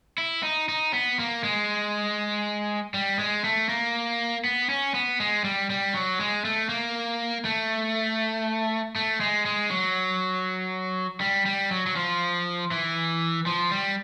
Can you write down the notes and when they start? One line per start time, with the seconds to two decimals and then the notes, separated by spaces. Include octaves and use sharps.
0.18 E4
0.43 D#4
0.69 D#4
0.94 B3
1.19 A#3
1.44 G#3
2.94 G3
3.19 G#3
3.44 A3
3.69 A#3
4.44 B3
4.69 C#4
4.94 B3
5.20 G#3
5.44 G3
5.70 G3
5.95 F#3
6.19 G#3
6.45 A3
6.69 A#3
7.45 A3
8.96 A3
9.21 G#3
9.46 G#3
9.71 F#3
11.21 G3
11.46 G3
11.71 F#3
11.87 F#3
11.96 F3
12.71 E3
13.46 F3
13.71 G3